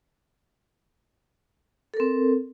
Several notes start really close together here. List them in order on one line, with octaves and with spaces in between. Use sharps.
A4 A#4 C4